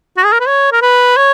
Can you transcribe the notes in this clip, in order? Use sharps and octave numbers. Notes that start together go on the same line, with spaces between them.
F#4
G#4
A#4
B4
C#5
A#4
B4
C#5